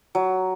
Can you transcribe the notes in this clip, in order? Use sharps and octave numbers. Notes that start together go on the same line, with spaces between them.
F#3